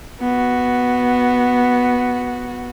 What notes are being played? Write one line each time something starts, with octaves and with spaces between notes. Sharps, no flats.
B3 F#4